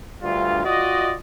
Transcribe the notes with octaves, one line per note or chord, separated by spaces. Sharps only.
D2 G2 F4
F4 F#4 D5 D#5